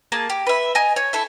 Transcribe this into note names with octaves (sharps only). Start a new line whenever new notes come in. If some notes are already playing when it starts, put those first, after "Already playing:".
A#3 G#4 A5
G4
B4 E5
D#5 G#5 A#5
C#5
E4 A4 E5